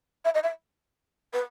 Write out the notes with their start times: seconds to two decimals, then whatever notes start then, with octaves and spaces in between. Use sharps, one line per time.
0.25 E5
0.35 D#5
0.43 E5
1.33 B4